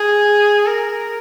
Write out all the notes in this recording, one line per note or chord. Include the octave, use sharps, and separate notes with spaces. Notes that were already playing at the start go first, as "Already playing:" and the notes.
Already playing: G#4
A#4